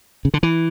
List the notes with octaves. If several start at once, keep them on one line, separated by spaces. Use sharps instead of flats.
C#3
D3
E3